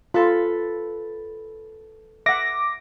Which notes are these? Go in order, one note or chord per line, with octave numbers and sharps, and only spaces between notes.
F4 A4 B4
E5 F#5 D6 A#6